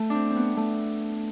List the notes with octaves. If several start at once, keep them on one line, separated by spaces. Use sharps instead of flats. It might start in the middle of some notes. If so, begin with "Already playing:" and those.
Already playing: A3
C4 D4
C4
B3
A3